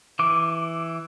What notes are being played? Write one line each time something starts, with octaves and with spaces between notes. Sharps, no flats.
E3 D6